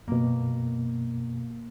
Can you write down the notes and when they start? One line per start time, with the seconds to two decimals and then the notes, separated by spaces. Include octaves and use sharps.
0.08 F#2 B2 A#3